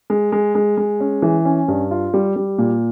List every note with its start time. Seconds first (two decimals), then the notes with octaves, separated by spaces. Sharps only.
0.10 G#3
0.32 G#3
0.55 G#3
0.77 G#3
1.00 C#4
1.22 E3
1.45 C#4
1.68 G2
1.91 F4
2.14 G3
2.36 G3
2.58 A#2